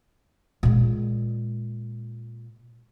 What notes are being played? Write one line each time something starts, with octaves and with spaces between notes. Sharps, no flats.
A#2 G#3